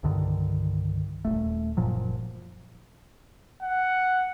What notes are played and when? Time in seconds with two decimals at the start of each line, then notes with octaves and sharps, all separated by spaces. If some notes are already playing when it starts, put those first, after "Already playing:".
0.03 C2 G2 D3 D#3
1.25 D#1 C#2 A3
1.77 F#1 A#2 F3 F#3
3.62 F#5